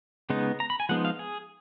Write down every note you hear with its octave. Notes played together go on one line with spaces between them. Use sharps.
C#3 G#3 B3 D#4
A#5
B5
G#5
F3 G#3 B3 D#4 F#5
F5
G#4